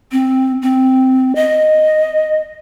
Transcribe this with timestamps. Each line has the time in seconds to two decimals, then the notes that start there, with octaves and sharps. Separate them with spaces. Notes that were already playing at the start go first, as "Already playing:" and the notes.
0.12 C4
0.62 C4
1.35 D#5